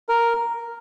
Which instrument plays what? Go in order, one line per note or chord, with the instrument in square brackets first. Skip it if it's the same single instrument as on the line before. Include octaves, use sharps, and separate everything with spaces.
[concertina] A#4